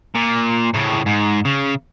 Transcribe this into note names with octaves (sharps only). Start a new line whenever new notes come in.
A#2
A2 C#3
G#2
C#3